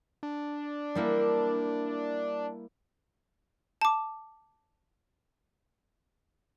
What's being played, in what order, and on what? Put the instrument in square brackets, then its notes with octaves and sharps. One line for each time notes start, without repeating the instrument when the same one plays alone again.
[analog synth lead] D4
[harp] G3 A#3 E4
[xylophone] A5 D6